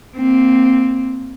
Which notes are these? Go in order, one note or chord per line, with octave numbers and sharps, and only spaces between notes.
A#3 C4